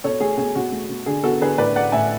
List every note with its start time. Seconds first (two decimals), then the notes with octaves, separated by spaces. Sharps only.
0.04 B2 A4 C#5
0.20 A3 G#4
0.38 B2 G#4
0.55 B2 F#4
0.72 A3
0.89 B2
1.06 D3 G#4
1.23 B3 F#4 A4
1.41 D3 G#4 B4
1.58 A2 B4 D5
1.76 A3 D5 F#5
1.92 A2 E5 G#5